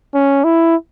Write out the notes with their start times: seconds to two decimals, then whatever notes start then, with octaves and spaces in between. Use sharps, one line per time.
0.15 C#4
0.44 E4